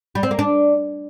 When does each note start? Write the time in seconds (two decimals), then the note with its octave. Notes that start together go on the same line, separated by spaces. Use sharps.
0.15 G3
0.23 C4
0.31 A#3
0.39 D4